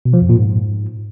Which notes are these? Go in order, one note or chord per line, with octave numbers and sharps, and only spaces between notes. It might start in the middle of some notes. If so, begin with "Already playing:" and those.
B2
F3
F2
A#2
G#2